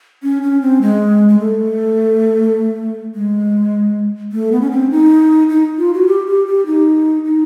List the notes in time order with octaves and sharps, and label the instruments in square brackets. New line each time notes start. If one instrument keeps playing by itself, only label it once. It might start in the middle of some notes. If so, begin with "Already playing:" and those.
[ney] C#4
C#4
C4
G#3
G#3
A3
G#3
A3
B3
C#4
C4
D#4
D#4
F4
F#4
G4
G4
G4
D#4
D#4